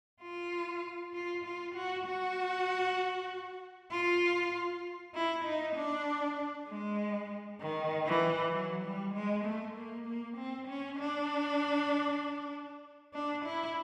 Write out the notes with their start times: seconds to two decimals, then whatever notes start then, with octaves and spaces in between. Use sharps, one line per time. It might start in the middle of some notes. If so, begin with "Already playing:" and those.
0.21 F4
1.14 F4
1.45 F4
1.75 F#4
2.06 F#4
3.91 F4
5.14 E4
5.45 D#4
5.76 D4
6.68 G#3
7.61 D#3
8.07 E3
8.53 F#3
8.84 G3
9.14 G#3
9.45 A3
9.76 A#3
10.07 A#3
10.37 C4
10.68 C#4
11.00 D4
13.14 D4
13.45 E4